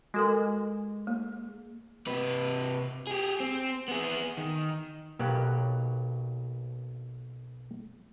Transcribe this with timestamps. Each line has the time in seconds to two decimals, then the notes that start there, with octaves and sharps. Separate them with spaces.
0.14 G#3 F#4 A4 A#4
1.07 A#3
2.07 C3 B4
3.07 G4 G#4
3.40 C4
3.88 B3 G#4
4.37 D#3
5.19 B1 B2 F#3 A#3 G4 F#5